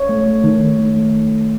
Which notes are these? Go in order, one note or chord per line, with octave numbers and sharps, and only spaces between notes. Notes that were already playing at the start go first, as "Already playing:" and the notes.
Already playing: C#5
A3
A3
D#3
D#3
A3
A3